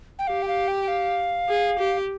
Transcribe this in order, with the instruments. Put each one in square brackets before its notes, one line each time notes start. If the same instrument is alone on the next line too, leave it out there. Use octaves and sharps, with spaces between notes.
[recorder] G5
[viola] G4 [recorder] F5
[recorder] G5
F5
G5
F5
[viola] G#4
G4